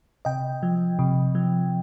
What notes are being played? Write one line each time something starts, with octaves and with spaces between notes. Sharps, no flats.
C3 D#5 G5
F3
C3
F3